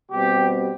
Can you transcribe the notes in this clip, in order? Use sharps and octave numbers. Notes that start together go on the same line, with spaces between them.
B2 G3 C4 G4